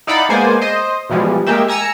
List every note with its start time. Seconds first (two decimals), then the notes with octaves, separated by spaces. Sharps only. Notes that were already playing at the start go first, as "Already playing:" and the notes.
0.07 D#4 E4 D5 F5 F#5 B5
0.29 G#3 A#3 B3 C5 D5 G#5
0.61 C5 D#5
1.09 B2 E3 F3 G3 G#3
1.47 G#3 A#3 G4 E5
1.68 G#5 A#5 E6 C#7